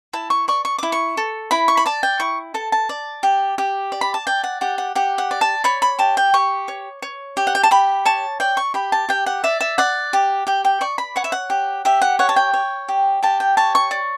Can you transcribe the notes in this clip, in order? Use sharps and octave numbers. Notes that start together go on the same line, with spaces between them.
E4 A5
C#6
D5 C#6
C#6
E4 D6
C#6
A4
E4 B5
C#6
B5
D5 A5
G5
E4 C#6
A4 A5
A5
D5
G4
G4
D5
B5
A5
D5 G5
F#5
G4 F#5
F#5
G4 F#5
F#5
D5
A5
C#5 B5
B5
G4 A5
G5
G4 C#6
C#5
C#5
G4
F#5
G5
A5
G4 B5
C#5 A5
D5 G5
C#6
G4 B5
A5
G4 G5
F#5
D5 E5
E5
D5 F#5
G4
G4 G5
G5
D5 C#6
B5
C#5 F#5
E5
F#5
G4
G4 E5
F#5
C#5 F#5
A5
G5
C#5
G4
G4 A5
G5
C#5 A5
C#6
D5